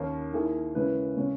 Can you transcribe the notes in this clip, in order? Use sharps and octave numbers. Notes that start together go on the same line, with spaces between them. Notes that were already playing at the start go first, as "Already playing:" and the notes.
Already playing: D#2 D#3 A#3 C#4
D#3 A#3 E4 G#4
C#3 G#3 C#4 E4 B4
C#3 G#3 C#4